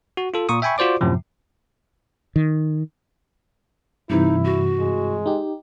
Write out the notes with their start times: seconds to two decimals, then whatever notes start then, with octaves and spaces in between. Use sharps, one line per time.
0.17 F#4
0.34 F4 A4
0.49 A#2 C#6 D#6
0.62 E5 G5 G#5 B5 C#6
0.78 F4 F#4 C5 D5 D6
1.01 F#2 A2 C3 F3
2.36 D#3
4.10 G2 C3 E3 D#4 E4
4.44 F#4
4.79 G#3
5.26 D#4 G4